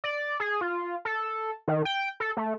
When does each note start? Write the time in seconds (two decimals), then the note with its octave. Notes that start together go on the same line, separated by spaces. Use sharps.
0.04 D5
0.40 G#4
0.61 F4
1.05 A4
1.68 D#3
1.85 G5
2.20 A4
2.37 A3